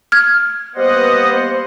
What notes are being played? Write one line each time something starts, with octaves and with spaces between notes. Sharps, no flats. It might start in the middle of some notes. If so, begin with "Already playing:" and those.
F6 G#6
G3 A#3 B3 C5 D#5 F#5